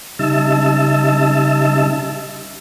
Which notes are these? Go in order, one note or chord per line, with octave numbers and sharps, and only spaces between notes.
C#3 G3 D#4 E5 A5 E6